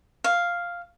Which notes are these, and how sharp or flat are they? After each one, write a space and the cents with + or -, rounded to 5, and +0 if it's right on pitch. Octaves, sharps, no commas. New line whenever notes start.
F5 +0 C#6 +0